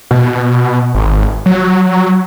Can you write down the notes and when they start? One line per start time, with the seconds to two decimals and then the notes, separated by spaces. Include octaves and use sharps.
0.11 B2
0.95 G#1
1.46 F#3